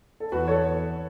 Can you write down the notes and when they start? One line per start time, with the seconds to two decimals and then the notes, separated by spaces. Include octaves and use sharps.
0.20 A4
0.32 E2 F#4 B4
0.48 A4 C#5